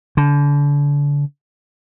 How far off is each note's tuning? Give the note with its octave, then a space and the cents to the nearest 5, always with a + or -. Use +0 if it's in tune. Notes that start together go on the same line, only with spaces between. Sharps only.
D3 -35